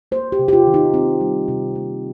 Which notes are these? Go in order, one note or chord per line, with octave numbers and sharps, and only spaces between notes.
A#3 C5
G4
C3
G4
F4
D#3
D#4
C3 C4
G3
C3
A#3